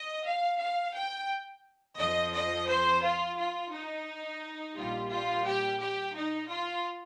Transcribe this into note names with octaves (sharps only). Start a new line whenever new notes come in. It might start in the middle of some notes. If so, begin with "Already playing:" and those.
Already playing: D#5
F5
F5
G5
F2 F3 D#5
D#5
C5
F4
F4
D#4
A#1 A#2 G3 F4
F4
G4
G4
D#4
F4